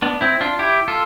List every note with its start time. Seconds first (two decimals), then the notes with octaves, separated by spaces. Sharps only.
0.02 B3 D4
0.21 C4 E4
0.41 D4 F4
0.59 E4 G4
0.88 F4 A4